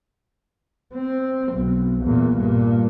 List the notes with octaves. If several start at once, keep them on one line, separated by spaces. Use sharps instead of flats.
C4
B1
E2 A#2
G2 A#2